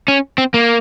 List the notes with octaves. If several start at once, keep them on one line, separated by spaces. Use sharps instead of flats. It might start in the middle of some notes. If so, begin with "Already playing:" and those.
C#4
C4
A#3